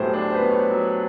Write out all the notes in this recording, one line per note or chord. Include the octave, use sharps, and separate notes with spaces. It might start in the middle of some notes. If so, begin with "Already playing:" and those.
Already playing: A2 F#3 B3 G4 G#4 C5
D4 C5
C5
B4
B3
C#5
C5
F#3